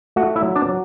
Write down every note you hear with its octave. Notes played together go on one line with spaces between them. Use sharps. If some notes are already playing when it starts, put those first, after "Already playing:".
A3 F#4 F#5
E4 E5
F#3
D4 D5
F#3